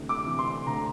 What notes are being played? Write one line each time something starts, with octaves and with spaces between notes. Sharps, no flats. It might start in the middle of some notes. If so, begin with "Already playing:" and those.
Already playing: D2 C3 E3
D6
C3 E3
C6
D2 A#5